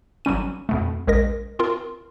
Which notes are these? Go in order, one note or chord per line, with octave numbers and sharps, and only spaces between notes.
G#1 F#3 G3 C#4 D#7
F2 B2 A3
A#1 G#3 A#4 A#6
C4 F4 A#4